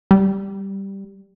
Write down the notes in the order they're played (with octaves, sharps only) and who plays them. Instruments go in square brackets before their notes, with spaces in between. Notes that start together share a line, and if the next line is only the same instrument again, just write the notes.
[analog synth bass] G3